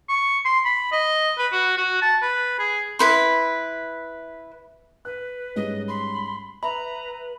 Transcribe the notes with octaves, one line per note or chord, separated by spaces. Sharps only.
C#6
C6
B5
D#5
B4
F#4
F#4
A5
B4
G#4
E4 B4 C6
B4 F#6
G#2 G3 C#4 D#5
B5 C6
B4 E5 A#5 B5